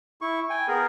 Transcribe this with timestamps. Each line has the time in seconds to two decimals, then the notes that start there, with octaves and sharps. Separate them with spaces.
0.21 E4 C#6
0.50 G5 G#5
0.68 B3 G#4 A#4